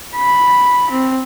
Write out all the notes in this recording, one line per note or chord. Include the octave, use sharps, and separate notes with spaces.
B5
C4